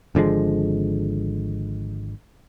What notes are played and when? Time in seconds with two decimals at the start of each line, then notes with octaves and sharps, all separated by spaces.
0.15 G#1 D3 F3 G#3